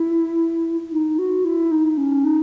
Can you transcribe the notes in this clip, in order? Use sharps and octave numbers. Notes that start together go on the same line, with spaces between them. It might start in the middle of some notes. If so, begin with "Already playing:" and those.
Already playing: E4
D#4
F#4
E4
D#4
C#4
D#4